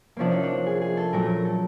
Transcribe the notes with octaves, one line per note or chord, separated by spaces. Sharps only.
C3 F3 A#3 C#4 D4
D#4
D4
G#4
G#4
A4
A#2 F#3 A3 A#4
A#4
A4